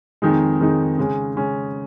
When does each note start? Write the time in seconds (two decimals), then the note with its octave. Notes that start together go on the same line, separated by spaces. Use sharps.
0.22 F2 D#3 G#3 D#4
0.60 F2 D#3 G#3 D#4
0.98 C#3 G#3 C#4
1.36 C#3 G#3 C#4